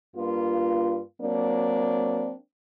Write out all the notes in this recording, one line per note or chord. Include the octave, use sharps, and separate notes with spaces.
G2 A#3 F4
F#3 A#3 C4 D4